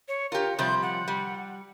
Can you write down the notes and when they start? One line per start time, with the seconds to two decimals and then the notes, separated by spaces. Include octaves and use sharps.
0.08 C#5
0.32 F4 G4 A#4
0.59 C3 F3 G3 G6
0.83 F#5
1.08 G3